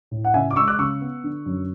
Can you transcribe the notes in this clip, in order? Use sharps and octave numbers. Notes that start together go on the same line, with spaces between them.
A2
F#5
C#3 E5 G#5
D6
G#3 C#6 E6
D6 F#6
C#3 C#6 E6
B3
D3
F#2